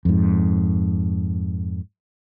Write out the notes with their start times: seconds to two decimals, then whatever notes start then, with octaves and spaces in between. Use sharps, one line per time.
0.05 F2 G#2